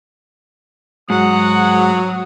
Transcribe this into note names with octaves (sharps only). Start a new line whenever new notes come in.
G#2 F#3 F#5 D#6